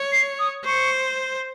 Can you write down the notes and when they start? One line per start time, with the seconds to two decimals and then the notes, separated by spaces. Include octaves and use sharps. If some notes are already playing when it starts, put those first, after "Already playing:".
Already playing: C#5
0.12 C7
0.39 D#6
0.65 C5 C#6